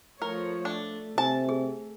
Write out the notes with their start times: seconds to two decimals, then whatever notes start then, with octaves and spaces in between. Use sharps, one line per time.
0.22 F3 A3 A#4 C#5
0.65 A3 D4
1.18 C3 G#5 A5
1.49 G#4